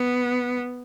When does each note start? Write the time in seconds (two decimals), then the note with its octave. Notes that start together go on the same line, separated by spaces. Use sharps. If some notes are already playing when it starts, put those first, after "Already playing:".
Already playing: B3